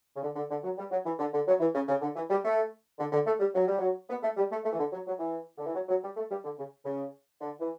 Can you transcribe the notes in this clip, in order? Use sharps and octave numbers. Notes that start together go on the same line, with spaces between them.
C#3
D3
D3
D3
F#3
G3
F#3
E3
D3
D3
F#3
E3
C#3
C#3
D3
E3
G3
A3
D3
D3
A3
G3
F#3
G3
F#3
B3
A3
G3
A3
A3
E3
D3
F#3
F#3
E3
D3
E3
F#3
F#3
G3
A3
G3
D3
C#3
C#3
D3
E3